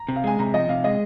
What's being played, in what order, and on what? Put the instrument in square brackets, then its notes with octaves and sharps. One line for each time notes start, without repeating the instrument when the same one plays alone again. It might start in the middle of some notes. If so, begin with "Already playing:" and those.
Already playing: [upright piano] A#5
[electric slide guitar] C3
[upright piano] F5
[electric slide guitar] G#3 [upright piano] G#5
[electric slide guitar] C3 [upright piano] A#5
[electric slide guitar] F3 [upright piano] D#5
[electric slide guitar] C3 [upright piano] F5
[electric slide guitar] G#3 [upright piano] D#5